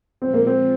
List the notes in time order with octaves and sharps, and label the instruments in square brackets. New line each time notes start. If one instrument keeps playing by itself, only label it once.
[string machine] A#2 F3 G#3 [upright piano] C4
[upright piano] A#3
C4